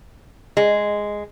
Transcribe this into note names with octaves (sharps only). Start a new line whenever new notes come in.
G#3